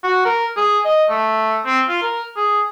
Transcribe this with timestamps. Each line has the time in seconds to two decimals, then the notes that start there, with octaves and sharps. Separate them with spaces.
0.04 F#4
0.25 A#4
0.57 G#4
0.85 D#5
1.10 A3
1.66 C4
1.89 F4
2.02 A#4
2.37 G#4